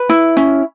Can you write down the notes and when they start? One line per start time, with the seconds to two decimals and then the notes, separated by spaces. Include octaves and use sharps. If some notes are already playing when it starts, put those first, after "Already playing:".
Already playing: B4
0.09 E4
0.37 C#4